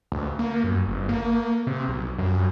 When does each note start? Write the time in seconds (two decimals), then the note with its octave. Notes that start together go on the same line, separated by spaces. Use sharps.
0.12 D2
0.39 A#3
0.64 F#2
0.87 G1
1.09 A#3
1.67 C3
1.88 B1
2.18 F#2